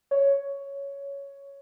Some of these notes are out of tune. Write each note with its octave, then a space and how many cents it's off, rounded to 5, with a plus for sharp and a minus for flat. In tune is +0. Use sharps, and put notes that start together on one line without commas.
C#5 +5